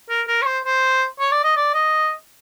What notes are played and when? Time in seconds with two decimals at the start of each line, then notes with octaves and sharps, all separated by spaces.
0.09 A#4
0.28 A#4
0.42 C#5
0.46 C5
0.65 C5
1.20 C#5
1.31 D5
1.44 D#5
1.56 D5
1.74 D#5